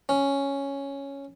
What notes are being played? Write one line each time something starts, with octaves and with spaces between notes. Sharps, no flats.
C#4